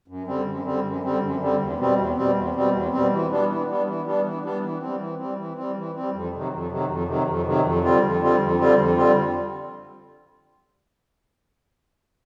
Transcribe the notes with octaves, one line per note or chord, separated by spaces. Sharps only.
F#2
D3 G3 C4
F#2
D3 G3 C4
F#2
D3 G3 C4
F#2
D3 G3 C4
E2
B2 G3 C4
E2
B2 G3 C4
E2
B2 G3 C4
E2
B2 G3 C4
E3
G3 B3 D4
E3
G3 B3 D4
E3
G3 B3 D4
E3
G3 B3 D4
E3
G3 C4
E3
G3 C4
E3
G3 C4
E3
G3 C4
F2
C3 D#3 F#3
F2
C3 D#3 F#3
F2
C3 D#3 F#3
F2
C3 D#3 F#3
F2
D3 G3 C4 F4
F2
D3 G3 C4 F4
F2
D3 G3 C4 F4
F2
D3 G3 C4 F4